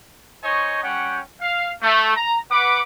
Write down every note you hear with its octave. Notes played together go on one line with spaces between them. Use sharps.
D#4 C5 C#5 D#5 G#5 C#6
G3 C#4 C#5 F#5 G5
F5
A3
A#5
B4 F#5 D6